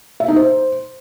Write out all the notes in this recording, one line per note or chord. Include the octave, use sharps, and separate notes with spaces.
E5
D#4
C5